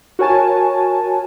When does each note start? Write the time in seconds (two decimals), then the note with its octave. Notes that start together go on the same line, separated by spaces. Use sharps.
0.19 F#4 A#4 C#5 G#5 A5